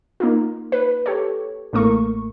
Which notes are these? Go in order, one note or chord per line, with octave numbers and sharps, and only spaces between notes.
A#3 D#4 F4
B4
G4 A4 C#5
A1 A2 A3 A#3 A#4 C#6